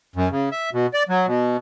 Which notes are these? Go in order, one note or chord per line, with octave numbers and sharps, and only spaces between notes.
F#2
C#3
E5
B2
D5
F#3
B2